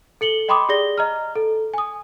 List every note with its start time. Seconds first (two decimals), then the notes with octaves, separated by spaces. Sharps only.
0.21 A4 C#7 F#7 G7
0.48 D#5 G5 B5 C6 D6 D#6
0.69 G4 G#4 D5 A#6 G7
0.98 D#5 A#5 F6
1.36 A4
1.74 G#5 D#6